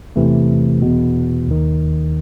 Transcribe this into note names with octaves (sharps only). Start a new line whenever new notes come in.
E2 C3 E3 A3
E2 B2
D#2 D#3